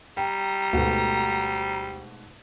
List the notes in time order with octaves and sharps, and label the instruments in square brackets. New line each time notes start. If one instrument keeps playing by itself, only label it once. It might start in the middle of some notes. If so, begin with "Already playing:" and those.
[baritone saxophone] G3 [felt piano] G5 [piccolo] A#5
[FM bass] D2 [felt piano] G#2 B2 A3